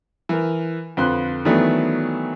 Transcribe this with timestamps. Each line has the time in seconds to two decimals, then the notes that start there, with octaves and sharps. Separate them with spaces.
0.29 E3 A#4
0.97 F2 D3 B4 C6 F#6
1.45 D#3 E3 F#3 A3 B3 D4